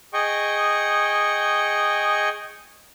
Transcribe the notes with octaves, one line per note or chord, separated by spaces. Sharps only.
G#4 D#5 G5 C#6